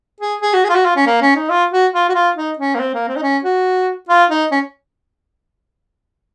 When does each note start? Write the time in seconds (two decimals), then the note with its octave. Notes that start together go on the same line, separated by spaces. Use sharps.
0.20 G#4
0.42 G#4
0.54 F#4
0.64 G#4
0.69 F4
0.75 F#4
0.85 F4
0.96 C#4
1.07 A#3
1.22 C#4
1.36 D#4
1.50 F4
1.72 F#4
1.93 F4
2.09 F#4
2.14 F4
2.36 D#4
2.59 C#4
2.75 A#3
2.80 C4
2.94 A#3
3.08 C4
3.16 D#4
3.23 C#4
3.44 F#4
4.09 F4
4.30 D#4
4.52 C#4